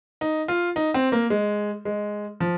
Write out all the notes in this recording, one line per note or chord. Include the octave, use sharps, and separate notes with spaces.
D#4
F4
D#4
C4
A#3
G#3
G#3
F3